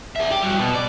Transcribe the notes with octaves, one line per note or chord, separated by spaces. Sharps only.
G#4 E5
G4
G3 F#4
B2
D5